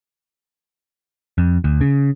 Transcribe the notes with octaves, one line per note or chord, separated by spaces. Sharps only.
F2
D2
C#3